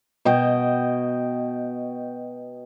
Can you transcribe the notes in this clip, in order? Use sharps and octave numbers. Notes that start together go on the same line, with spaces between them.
B2 D#5 G5